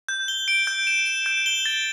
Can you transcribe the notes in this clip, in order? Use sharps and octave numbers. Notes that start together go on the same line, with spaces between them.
G6
G7
D7
G6
E7
E7
G6
G7
A6